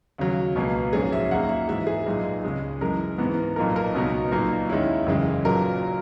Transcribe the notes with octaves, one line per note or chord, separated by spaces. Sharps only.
D#2 C#3 F#3
C#2 B2 F#3 A#3
A#1 G#2 F#3 C#4 G#4
E5
D#2 D#3 F#3 A#3 F#5
E5
G#2 E3 G#3 E5
G#4
B1 A#2 G#3 D#4
C#2 C#3 G#3
F#2 E3 G#3 A#4
G#2 E3 B3
B1 A#2 A#3 D#4 A#4
A#4
C#2 B2 F#3 B3 D#4
B1 A#2 A#3 D#4
D#2 D#3 G#3 C#4 E4
F#1 E2 C#3 G#3
B1 A#2 F#3 A#4